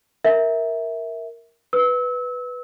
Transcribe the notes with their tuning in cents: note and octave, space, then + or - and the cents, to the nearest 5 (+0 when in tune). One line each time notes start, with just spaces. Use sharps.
A#4 +0 E5 -15
B4 +0 E6 -30